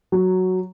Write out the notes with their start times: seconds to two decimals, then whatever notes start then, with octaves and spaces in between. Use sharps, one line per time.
0.12 F#3